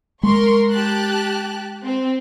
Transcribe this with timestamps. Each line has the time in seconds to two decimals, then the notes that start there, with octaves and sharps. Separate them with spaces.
0.23 G#3 A#4 C6 C#6
0.69 G4 A5 F#6
1.84 C4